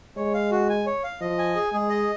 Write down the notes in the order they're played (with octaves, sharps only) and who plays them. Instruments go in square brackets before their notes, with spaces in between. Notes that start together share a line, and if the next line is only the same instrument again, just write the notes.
[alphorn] G#3 [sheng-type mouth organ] C#5
[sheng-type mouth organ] F5
F#4
G#5
C#5
F5
[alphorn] F3 [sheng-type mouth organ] D#5
[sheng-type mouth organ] G#5
G#4
[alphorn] G#3 [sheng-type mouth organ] G#4
[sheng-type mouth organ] D#5